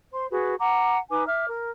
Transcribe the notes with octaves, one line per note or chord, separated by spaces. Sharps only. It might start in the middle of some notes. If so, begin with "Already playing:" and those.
C5 C6
F#4 G#4 B4
F#5 A#5 D6
D#4 B4 G#5 D6
E5 D6 F6
A#4